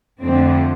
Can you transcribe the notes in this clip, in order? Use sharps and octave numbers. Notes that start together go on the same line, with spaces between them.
F2 D3 A3 C4